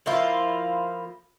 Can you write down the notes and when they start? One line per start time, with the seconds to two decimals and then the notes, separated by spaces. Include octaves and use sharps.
0.06 F3 A#3 E4 F4